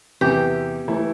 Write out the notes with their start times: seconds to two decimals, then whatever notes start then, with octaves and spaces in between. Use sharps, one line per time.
0.21 E2 C3 E3 G4
0.88 E3 A3 E4